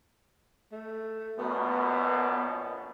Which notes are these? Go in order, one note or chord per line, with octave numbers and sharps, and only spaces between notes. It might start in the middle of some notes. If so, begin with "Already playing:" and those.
A3
A#1 F#2 B2 B3